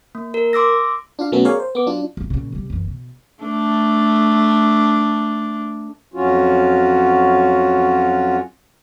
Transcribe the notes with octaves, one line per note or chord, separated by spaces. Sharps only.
A#3
A#4
C6 D6 E6 A#6
D4 F4 F5
B2 F#3 A3 B3 C#4 A4
G#4 A#4 C#5 D5 F5 G#5
C5
B3 D6
F#3 D4 F4
D1 G#1
A#2 C#3
C2 G3
F#1 E3
B2
A3 D4
F2 F#3 C#4 F4 F#4